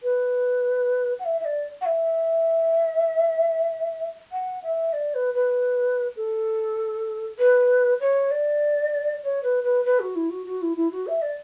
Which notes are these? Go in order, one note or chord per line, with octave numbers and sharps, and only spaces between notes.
B4
F#5
E5
E5
D5
F#5
E5
F#5
E5
D5
B4
B4
A4
B4
C#5
D5
C#5
B4
B4
B4
F#4
E4
F#4
F#4
E4
E4
F#4
E5
D5